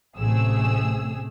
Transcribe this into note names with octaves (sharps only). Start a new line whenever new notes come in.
A1 C3 A3 G#4 E6